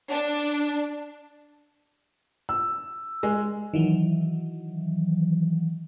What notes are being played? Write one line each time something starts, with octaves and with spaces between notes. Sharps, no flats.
D4
E6
G#3
D#3 E3 F#3